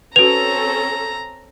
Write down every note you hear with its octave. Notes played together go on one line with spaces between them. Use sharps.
C4 C#4 F#4 A4 B4 A#5 F7